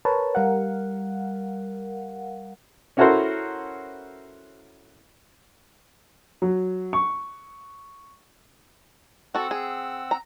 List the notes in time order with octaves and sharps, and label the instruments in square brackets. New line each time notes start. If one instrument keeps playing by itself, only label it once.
[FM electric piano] A#4 B4 C#5 A5
G3 A#4 F5 F#5
[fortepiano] C#4 E4 F#4 A4 A#4 C5
[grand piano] F#3
C#6
[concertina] C4 F#5 E6 [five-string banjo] F#4 A4
[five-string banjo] G#4
A#5